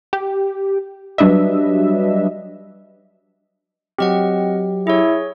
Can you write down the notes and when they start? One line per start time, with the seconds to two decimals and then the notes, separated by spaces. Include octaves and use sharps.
0.13 G4
1.18 F#3 G3 D4 B4 D#5 E5
3.99 F#3 C4 G4 D#5 F#5
4.87 E4 G#4 C#5